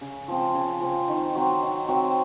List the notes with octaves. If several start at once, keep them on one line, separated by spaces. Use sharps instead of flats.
C#3
F3 C4
C#3
F3 C4
D#3
F#3 C4
D#3
F#3 C4